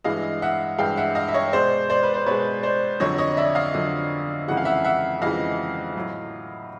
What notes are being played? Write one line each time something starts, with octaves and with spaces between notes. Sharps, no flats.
G2 E3 G#3 D#5 F5
E5 F#5
G2 E3 G#3 F5 G5
E5 F#5
D#5 F5
E5
C#5 D#5
B2 G#3 C5 D5
C5 D5
B4
C5
B2 G#3 B4 C#5
C5 D5
F2 D3 F#3 C#5 D#5
C#5 D#5
D5 E5
D#5 F5
F2 D3 F#3
F2 C#3 E3 G#3 F#5
F5
E5 F#5
E5 F#5
F2 C#3 E3 G#3 D#5 F5
A2 F#3